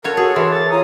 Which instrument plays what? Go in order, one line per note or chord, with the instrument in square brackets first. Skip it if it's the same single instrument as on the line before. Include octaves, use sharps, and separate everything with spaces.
[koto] F4 F#4 C#5 [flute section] A4 [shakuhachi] A#4
[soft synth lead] F#4 [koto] G#4
[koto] E3 [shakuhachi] B4 [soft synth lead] C6
[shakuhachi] A#4 [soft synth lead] A6
[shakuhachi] F4 [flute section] C#5 A#5 [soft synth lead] D#6